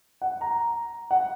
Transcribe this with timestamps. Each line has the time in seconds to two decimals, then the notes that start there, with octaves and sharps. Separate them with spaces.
0.22 F#5
0.41 A#5
1.11 F#5